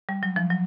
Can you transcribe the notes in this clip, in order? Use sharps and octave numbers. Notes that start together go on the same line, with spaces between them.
G3
F#3
F3
F#3